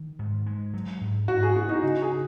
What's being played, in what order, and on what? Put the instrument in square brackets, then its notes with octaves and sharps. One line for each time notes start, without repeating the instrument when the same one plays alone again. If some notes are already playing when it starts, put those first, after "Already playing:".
Already playing: [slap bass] D#3
G#2
G#3
F#3
G#2
[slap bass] G#2 [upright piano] F#4
[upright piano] G#4
[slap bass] B3 [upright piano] F#4
[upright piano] D#4
[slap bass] C#3 [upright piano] F#4
[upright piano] G#4